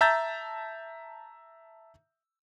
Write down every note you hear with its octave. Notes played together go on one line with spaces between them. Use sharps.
E5 A5 A#5 E6 G6 A6